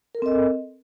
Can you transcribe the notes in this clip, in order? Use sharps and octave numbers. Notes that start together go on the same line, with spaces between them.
C4 A4 A#4 D#5